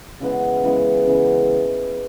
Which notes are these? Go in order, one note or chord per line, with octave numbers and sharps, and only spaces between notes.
C#3 E3 G#3 B3
C#3 E3 G#3 B3
C#3 E3 G#3 B3